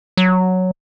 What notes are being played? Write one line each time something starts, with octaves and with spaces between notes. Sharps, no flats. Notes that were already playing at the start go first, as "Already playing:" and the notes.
F#3